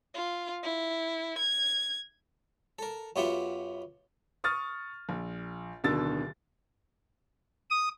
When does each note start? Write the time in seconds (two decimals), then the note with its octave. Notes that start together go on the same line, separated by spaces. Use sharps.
0.14 F4
0.63 E4
1.38 G#6
2.79 A4 A#4
3.16 F#2 B3 F4 G4 E5 F#5
4.44 C#6 D#6 F6 A6
5.09 A#1
5.84 D1 B2 D3 D#3 E6 A6
7.70 D#6